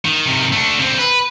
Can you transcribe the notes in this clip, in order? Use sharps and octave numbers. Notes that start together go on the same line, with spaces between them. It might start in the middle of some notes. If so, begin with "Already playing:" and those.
D#3
C3 D#3
A3 D4
D3 C4
B4